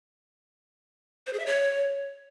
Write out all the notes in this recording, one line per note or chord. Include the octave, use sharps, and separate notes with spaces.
C5
G#4
E5
C#5